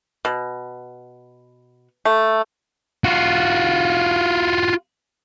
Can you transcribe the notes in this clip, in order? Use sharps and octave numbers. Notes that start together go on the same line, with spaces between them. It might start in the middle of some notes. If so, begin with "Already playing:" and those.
B2
A3
F4 F#4